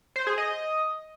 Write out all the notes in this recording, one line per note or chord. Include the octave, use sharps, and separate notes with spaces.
C5
G#4
D#5